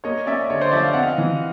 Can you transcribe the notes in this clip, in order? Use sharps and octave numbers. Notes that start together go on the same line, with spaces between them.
A#3 C#5 D#5
C#4 D5 E5
E5
D3 C#5 D#5
C5 D5
F3 D5 E5
F5
C4 F#5
D#5 F5
E3